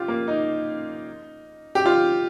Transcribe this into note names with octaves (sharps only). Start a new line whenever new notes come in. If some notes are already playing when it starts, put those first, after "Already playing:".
Already playing: F4 G4
A#3
D#4
G4
F4